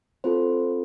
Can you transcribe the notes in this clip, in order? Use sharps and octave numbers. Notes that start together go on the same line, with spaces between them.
C4 F4 A4 C5